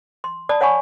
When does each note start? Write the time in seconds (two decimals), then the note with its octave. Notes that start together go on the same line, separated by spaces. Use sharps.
0.24 C6
0.49 D5 A5 B5 D#6
0.61 C#5 F#5 G#5 B5 C#6